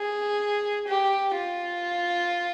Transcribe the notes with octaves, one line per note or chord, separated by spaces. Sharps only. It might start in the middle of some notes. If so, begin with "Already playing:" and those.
Already playing: G#4
G4
F4